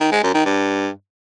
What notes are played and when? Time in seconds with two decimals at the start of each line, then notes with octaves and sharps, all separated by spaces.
0.01 D#3
0.12 G#3
0.23 F#2
0.34 D#3
0.46 G2